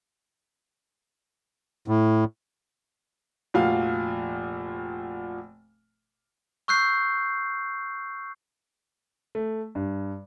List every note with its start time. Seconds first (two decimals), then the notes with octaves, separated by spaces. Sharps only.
1.88 A2
3.54 F1 A#2 F3 F#4 F5
6.68 C#6 E6 F#6 G6 C7
9.35 A3
9.75 G2